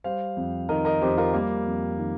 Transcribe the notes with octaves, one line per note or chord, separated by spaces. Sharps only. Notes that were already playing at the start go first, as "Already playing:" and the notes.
G3 C5 F5
F2
D#3 A#4 D#5
A#4 D#5
F2 G4 C5
F4 A#4
G3 A#3
F2
D#3